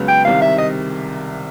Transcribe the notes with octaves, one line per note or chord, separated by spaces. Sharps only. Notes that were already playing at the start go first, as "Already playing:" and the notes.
Already playing: C#2 C#3 F#3 B3
G5
C2 C3 D#3 F5
E5
D#5